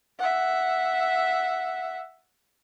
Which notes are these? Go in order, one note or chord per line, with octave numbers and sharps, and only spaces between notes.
E5 F#5